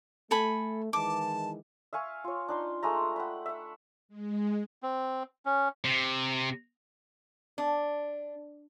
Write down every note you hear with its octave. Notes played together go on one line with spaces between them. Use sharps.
A3 A4 G#5 B5
D#3 E3 G#3 A5 D6
E5 F5 G#5 C#6
F4 C#5
D4 D#4 C6
G#3 A3 A#5
F#5 G5 B5
E5 F#5
G#3
C4
C#4
C3
D4